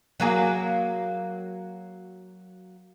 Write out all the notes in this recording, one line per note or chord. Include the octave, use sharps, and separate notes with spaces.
F#3 A#3 G#4